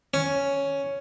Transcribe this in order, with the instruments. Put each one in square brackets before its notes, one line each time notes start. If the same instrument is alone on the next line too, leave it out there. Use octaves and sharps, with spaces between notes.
[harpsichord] C#4